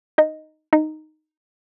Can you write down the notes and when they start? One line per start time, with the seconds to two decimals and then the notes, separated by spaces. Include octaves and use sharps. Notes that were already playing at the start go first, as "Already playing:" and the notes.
0.18 D#4 D#5
0.73 D#4 D#5